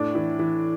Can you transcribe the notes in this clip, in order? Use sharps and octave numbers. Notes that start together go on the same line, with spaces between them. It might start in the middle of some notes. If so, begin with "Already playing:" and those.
Already playing: A2 D4
E3
E3